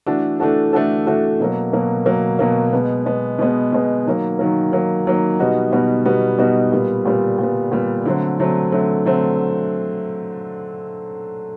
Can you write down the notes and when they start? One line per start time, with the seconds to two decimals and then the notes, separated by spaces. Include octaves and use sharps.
0.06 E3 A3 D4 F#4 A4
0.40 E3 A3 D4 F#4 A4
0.73 E3 A3 D4 F#4 A4
1.06 E3 A3 D4 F#4 A4
1.40 B2 F#3 A#3
1.73 B2 F#3 A#3
2.06 B2 F#3 A#3
2.39 B2 F#3 A#3
2.73 B2 G#3 B3
3.06 B2 G#3 B3
3.39 B2 G#3 B3
3.72 B2 G#3 B3
4.05 D#3 F#3 A#3
4.39 D#3 F#3 A#3
4.72 D#3 F#3 A#3
5.06 D#3 F#3 A#3
5.39 B2 G3 B3 D#4 F#4
5.72 B2 G3 B3 D#4 F#4
6.05 B2 G3 B3 D#4 F#4
6.38 B2 G3 B3 D#4 F#4
6.72 A#2 G3 B3
7.05 A#2 G3 B3
7.39 A#2 G3 B3
7.72 A#2 G3 B3
8.05 D3 F#3 A3 C4
8.39 D3 F#3 A3 C4
8.72 D3 F#3 A3 C4
9.05 D3 F#3 A3 C4